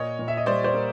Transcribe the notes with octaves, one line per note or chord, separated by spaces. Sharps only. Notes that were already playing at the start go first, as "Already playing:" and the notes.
Already playing: A#2 C#5 D#5
A#2
E5
D#5
G3 C5 D5
C5 D5
A#3